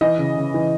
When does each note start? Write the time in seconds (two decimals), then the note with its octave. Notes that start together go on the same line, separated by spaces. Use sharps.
0.01 E3 D#5
0.18 C#3
0.36 C#3
0.54 E3